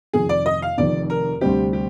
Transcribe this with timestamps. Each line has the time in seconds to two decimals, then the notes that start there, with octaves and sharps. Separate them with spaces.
0.13 F1 F2 D#3 G#4
0.29 D5
0.46 D#5
0.62 F5
0.78 F1 F2 D#3 D5
1.10 A#4
1.41 D2 C3 G3 C4 G4
1.73 G4